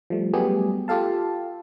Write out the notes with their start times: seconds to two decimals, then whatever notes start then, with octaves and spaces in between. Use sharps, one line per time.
0.10 F3 G3 A3
0.33 F#3 G3 A3 B3 G4 G#4
0.88 F4 G4 A4 F5 A5